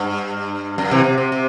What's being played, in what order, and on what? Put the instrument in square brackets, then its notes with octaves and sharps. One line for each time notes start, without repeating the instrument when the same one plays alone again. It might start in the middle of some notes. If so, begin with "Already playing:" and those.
Already playing: [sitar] G2
F#2
C3 E3
C3
C3
C3